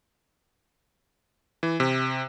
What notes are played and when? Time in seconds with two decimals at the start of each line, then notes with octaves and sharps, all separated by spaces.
1.63 E3
1.80 C3